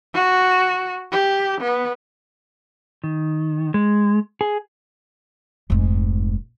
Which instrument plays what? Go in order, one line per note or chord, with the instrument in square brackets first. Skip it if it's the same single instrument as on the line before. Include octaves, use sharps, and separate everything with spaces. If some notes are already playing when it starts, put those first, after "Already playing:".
[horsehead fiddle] F#4
G4
B3
[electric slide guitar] D#3
G#3
G#4
[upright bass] F1 G#2